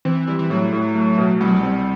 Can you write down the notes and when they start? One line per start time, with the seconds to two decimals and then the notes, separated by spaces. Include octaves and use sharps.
0.05 E3 C4
0.27 E3 G3
0.39 E3
0.50 A2 F#3
0.73 A2
0.95 A3
1.18 B2
1.41 C2 G3
1.48 F#3
1.56 G3
1.63 C4